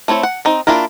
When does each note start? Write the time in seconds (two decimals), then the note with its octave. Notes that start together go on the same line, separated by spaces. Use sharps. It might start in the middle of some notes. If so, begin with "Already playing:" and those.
0.08 A3 C4 E4 C#5
0.23 F#5
0.45 C4 D#4
0.67 A#3 D4 E4 F4 A#4